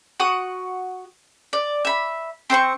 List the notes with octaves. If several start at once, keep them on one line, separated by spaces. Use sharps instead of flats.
F#4 F#5 D#6
D5
E5 B5
C4 C5 C6 C#6